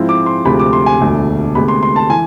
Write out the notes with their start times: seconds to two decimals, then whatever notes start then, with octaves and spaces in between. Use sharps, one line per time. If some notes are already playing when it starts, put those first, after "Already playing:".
Already playing: G#2 F3 G#3 C4 E4
0.09 D6
0.26 C6
0.45 D2 C3 F3 G#3 B5
0.59 D6
0.73 C6
0.86 G#5
1.00 E1 D2 D3 A3
1.55 D2 C3 G#3 B3 B5
1.68 C6
1.83 C6
1.96 A5
2.10 E3 G#5